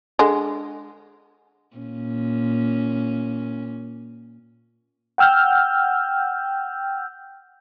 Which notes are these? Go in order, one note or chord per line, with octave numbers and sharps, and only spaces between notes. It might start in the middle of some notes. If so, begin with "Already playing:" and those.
D3 G#3
A#2 C#4
F#5 G5 E6 F6 G6